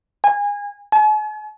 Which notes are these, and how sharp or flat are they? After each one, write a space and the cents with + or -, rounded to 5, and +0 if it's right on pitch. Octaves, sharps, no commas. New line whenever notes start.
G#5 -25
G#5 +45